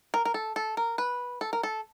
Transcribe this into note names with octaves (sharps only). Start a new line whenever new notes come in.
A#4
A#4
A4
A4
A#4
B4
A4
A#4
A4